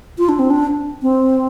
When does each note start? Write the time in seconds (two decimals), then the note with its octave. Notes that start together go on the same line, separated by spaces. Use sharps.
0.18 F4
0.29 D4
0.39 C4
0.50 D4
1.02 C4